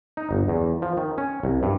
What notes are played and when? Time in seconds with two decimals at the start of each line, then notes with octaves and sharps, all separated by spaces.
0.17 D#4
0.31 G1
0.48 E2
0.82 F3
0.97 D#3
1.18 C#4
1.43 C2
1.63 G2